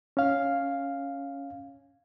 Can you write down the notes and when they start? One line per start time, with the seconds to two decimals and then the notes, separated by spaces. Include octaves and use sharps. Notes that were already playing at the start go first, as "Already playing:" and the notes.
0.17 C#4 F5